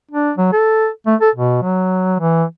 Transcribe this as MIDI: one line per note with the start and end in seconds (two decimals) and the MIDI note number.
0.11 0.32 62
0.37 0.48 54
0.53 0.89 69
1.06 1.15 57
1.21 1.30 69
1.35 1.60 47
1.62 2.15 54
2.19 2.44 52